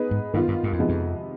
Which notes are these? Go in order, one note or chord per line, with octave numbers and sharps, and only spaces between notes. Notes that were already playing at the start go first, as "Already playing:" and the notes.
Already playing: B3 D#4 G#4 B4
G#2
G2 D#3 B3 F4
G2
G2
F2
C3 F3 G#3 B3 D#4
F2